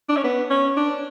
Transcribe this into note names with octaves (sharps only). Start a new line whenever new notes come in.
D4
C#4
B3
C#4
D4